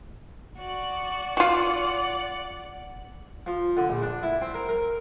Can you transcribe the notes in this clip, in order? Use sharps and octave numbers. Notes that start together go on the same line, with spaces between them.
F#4 D5
F4 F#4 D5 F#5
F3
D3
A#1
D4
E4
C4
A#4
A#4